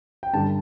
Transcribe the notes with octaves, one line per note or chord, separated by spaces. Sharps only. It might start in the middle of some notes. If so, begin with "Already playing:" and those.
G5
G2 D3 G3 A5